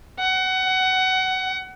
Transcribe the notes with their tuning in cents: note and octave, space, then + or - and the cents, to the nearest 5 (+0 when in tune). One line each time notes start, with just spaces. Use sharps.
F#5 +20